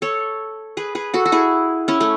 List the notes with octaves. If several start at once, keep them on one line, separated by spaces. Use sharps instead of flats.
A4 C#5
G#4 B4
G#4 B4
F#4 A4
F#4
E4 G#4
C#4 E4
A3 C#4